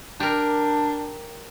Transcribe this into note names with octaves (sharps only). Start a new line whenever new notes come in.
D4 G4 A#4